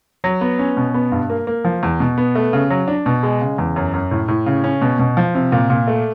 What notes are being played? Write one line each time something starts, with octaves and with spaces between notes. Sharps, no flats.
F#3
B3
C#4
B2
B3
G2
A#3
A#3
F3
E2
B2
B3
A3
C#3
F#3
D4
B2
G#3
C#3
E2
F#2
F#2
A2
A2
C#3
C#4
B2
B2
F3
C3
A#2
A#2
A3